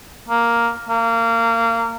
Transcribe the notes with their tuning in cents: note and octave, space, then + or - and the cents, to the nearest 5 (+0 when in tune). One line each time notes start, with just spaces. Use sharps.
A#3 +0
A#3 -25